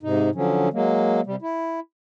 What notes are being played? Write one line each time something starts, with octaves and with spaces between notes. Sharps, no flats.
G#2 C3 D#4
D3 F3 F#3 C#4
F#3 G#3 A#3
C3 G3
E4